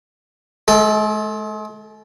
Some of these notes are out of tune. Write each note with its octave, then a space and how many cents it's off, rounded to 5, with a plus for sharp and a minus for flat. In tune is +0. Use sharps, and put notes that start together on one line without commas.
G#3 +45 A4 +0 G5 +0